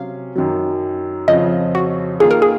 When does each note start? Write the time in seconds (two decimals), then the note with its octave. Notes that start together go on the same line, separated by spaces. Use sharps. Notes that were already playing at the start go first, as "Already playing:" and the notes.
Already playing: C3 F#3 C#4 F5
0.36 F#2 D#3 F#3
1.28 F2 C#3 F3 C4 F4 D#5
1.75 F#4
2.20 D#3 A#3 F4 G#4
2.31 A#4
2.42 G#4